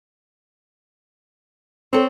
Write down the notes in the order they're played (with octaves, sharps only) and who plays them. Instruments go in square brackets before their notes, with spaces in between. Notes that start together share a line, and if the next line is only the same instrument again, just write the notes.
[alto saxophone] C4 [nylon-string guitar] A4 C#5